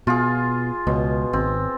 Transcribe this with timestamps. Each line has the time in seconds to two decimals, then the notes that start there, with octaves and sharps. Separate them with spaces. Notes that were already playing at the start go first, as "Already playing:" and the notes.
0.07 B2 F4 G#4
0.87 C#2 B2
1.33 G#1 C4